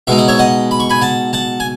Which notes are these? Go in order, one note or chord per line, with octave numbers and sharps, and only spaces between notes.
B2 G#3 D#4 E5
F#5
C#5 E5
D#5 F#5
B5
C#6
G#5 B5
F#5 A5
F#5 A5
G#5